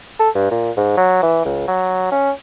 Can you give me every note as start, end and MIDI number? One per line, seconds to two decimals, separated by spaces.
0.20 0.29 69
0.35 0.49 43
0.51 0.71 46
0.77 0.95 44
0.97 1.20 54
1.23 1.41 52
1.45 1.67 37
1.68 2.08 54
2.11 2.31 61